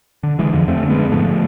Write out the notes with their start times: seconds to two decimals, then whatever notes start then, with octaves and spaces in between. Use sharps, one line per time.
0.23 D3
0.39 D3 E3 G#3
0.53 F2 D3 F3
0.68 F2 A3 C4
0.83 D3
0.90 G#3 B3
0.97 D3
1.12 G#2 F3 A3